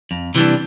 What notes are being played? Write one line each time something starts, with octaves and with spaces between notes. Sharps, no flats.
F2
C3 E3 G3 D4